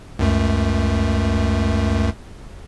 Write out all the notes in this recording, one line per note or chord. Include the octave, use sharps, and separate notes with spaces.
C#2 F#2 A3